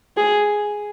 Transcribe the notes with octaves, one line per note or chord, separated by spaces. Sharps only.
G#4